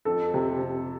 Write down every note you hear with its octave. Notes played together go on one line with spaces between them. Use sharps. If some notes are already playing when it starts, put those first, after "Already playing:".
F2 A4
C3
C3